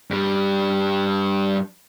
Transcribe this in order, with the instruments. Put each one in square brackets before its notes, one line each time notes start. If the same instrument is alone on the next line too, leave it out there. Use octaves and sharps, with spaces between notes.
[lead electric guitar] G2 G3